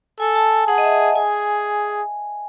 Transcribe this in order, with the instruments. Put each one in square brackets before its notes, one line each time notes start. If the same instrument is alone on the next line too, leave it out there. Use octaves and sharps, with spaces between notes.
[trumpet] A4 [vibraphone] G#5
[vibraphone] A5
G#5
[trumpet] G#4 [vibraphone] F#5
[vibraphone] D#5
E5
[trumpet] G#4 [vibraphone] G#5